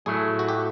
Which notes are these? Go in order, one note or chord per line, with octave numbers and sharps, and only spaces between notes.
A2 F#3 A3 G#4
F#4
G4